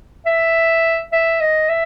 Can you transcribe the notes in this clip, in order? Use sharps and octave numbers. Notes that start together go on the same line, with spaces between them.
E5
E5
D#5
E5